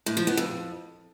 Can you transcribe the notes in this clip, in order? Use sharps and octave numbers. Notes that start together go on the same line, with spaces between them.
A2
F3
B3
F2